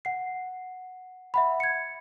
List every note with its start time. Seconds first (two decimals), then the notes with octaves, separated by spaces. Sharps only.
0.05 F#5 C7
1.34 E5 F#5 B5
1.60 G#6 C#7